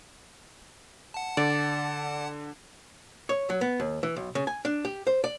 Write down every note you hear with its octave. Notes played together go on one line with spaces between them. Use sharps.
F#5 A5
D3 D5
C#5
F#3
B3
D#2
E3
B1
C#3
G#5
D4
G4
C5
D5